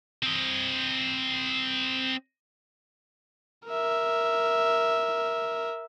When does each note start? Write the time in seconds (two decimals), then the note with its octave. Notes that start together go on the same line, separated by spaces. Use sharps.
0.23 C4 D#5
3.68 A#4 E5